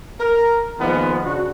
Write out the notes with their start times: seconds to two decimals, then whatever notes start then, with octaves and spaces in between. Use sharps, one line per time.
0.20 A#4
0.79 A#2 D#3 F3 G#3 B3
1.23 C#3 D4 F#4